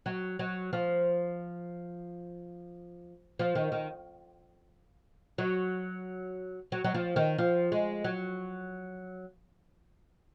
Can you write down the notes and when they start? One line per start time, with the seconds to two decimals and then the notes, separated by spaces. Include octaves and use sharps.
0.06 F#3
0.39 F#3
0.73 F3
3.39 F3
3.55 D#3
3.72 D#3
5.38 F#3
6.72 F#3
6.84 F#3
6.94 F3
7.16 D#3
7.38 F3
7.72 G#3
8.04 F#3